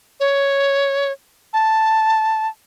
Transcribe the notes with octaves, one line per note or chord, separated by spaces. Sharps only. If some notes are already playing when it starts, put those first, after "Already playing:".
C#5
A5